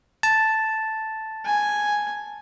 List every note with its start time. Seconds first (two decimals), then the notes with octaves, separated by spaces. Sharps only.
0.23 A5
1.45 G#5